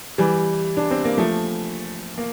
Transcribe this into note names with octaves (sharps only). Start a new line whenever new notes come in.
E3 G3
D4
C4
A#3
F3 A3
A#3